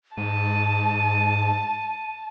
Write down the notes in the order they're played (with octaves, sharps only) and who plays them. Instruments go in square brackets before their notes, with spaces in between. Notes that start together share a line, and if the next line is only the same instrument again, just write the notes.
[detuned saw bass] G#2 [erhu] A5 [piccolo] D#7